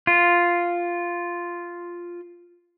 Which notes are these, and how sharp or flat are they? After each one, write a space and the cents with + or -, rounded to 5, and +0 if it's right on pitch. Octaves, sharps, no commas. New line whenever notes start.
F4 -5